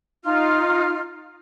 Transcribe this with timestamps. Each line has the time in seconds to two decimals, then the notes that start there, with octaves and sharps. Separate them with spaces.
0.24 D#4 F4 F6